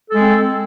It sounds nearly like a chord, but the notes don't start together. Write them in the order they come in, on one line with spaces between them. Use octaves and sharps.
A4 G#3 C4